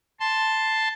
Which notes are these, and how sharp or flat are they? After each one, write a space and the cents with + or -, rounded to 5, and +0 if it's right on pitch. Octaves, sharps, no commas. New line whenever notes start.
A5 +0 C6 +0